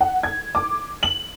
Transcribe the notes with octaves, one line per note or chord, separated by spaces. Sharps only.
F#5
G#6
D6
F#7